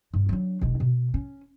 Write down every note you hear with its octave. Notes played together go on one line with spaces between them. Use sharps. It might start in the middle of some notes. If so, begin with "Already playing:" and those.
G2
F#3 D4
E1 G#3
B2
C#4